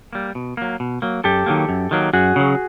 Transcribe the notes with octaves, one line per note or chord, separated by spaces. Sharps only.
G3 A#3
B2
F#3 A#3
B2
F#3 A#3
F#2 G4 A4
D#3 F#3 A#3
F#2
D#3 F#3 A#3
F#2 F#4 G#4
C#3 F#3